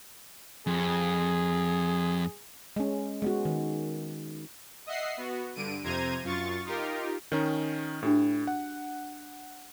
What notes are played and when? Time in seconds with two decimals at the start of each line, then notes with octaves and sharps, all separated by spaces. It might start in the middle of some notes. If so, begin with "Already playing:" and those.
0.67 F2 G#4
2.76 G#3 C#4
3.22 G#3 B3 F#4
3.45 D#3
4.86 D#5 E5 F#5 C7
5.17 B3 F#4
5.55 G2 D3 D7 D#7
5.83 F2 C3 C5 A#5 G#6 D#7
6.23 F#2 F4 C#6 A6
6.65 D#4 F4 G4 A#4
7.32 D#3 C#4 D#4
8.03 A2 D4 F#4 G4
8.47 F#5